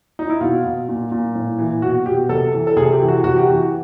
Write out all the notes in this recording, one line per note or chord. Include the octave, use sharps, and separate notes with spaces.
D#4
E4
B2 F4
B2
A#2
A#2
A2
E3
B2 F#4
B2 G4
C3 A4
E3
A4
C3 G#4
G4
E3
F#4
C3 F#4
G4
E3 F#4